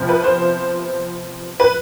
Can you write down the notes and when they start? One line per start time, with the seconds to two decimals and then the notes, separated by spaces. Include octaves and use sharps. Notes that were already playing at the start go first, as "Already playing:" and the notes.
Already playing: C3 F3 B3
0.09 B4
0.24 C5
1.60 B4